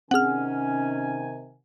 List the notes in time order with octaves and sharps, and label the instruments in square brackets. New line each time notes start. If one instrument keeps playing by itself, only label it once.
[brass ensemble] C3 D#3 G#5 [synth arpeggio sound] C4 G#4 [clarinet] C#4 [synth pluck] F#5 F6